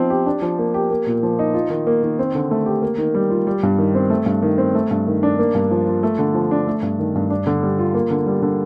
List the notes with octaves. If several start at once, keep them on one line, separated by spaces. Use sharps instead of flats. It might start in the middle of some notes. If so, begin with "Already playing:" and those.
Already playing: F3 C4 D#4
G4
D4
F3
A#3
G4
A#3
A#2
F3
D#4
F4
D#3
A#3
D#3
C4
D3
A3
G4
A#3
D#3
G3
F4
G3
G2
D#3
C4
A3
G2
D#3
C4
A3
G2
D#3
D4
A#3
G2
F3
F4
A3
D3
F3
D4
A3
G2
D#3
G2
D4
D3
G3
F4
A#3
D3
G3
D3